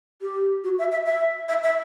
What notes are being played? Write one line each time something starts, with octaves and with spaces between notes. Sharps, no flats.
G4
F#4
E5
E5
E5
E5
E5